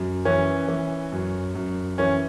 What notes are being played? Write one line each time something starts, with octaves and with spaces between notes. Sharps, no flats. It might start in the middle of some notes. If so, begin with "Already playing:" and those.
Already playing: F#2
E3 C#4
E3
F#2
F#2
E3 C#4